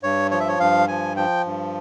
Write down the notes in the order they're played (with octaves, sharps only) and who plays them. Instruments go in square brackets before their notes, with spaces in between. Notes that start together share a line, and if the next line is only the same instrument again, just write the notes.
[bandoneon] G2 C#5
F3 C#5
E5
C#5
G2 F5
F3 G#5
F3 G5
G2